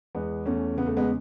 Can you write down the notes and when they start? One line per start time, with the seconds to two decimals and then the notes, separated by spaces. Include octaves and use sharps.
0.15 E2 G#3 B3
0.46 E2 A3 C#4
0.77 C#3 B3
0.87 A3
0.97 G#3 B3